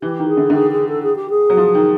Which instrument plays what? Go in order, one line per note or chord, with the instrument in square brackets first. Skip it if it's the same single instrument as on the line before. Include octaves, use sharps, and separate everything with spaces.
[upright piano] E3 [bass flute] G4
[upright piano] D#3
[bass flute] G#4
[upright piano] D3
D3
[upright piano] D#3 [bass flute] G#4
[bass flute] G#4
A4
G#4
G4
G#4
[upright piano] F#3
F3
D#3